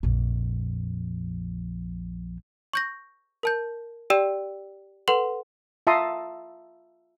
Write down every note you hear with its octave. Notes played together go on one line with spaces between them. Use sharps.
A#1 F2
C#6 G6 A#6
A#4 A5 G6
G4 D5 G5 E6 E7
A4 B4 F#5 C6 F#7
F4 E5 A5 A#5 C6 D#6